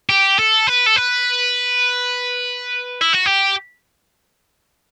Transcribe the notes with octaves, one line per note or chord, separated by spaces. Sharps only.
G4
A4
B4
A4
B4
E4
F#4
G4